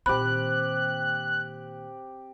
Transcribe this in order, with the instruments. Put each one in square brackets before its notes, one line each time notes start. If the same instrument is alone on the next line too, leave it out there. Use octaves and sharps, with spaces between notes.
[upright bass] A#2 D#3 [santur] C4 G4 [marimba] B5 [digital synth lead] F#6